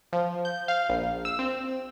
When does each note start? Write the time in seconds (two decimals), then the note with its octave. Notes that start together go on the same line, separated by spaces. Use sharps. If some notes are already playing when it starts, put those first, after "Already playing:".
0.13 F3
0.45 G6
0.68 F5
0.89 A#1
1.25 E6
1.39 C4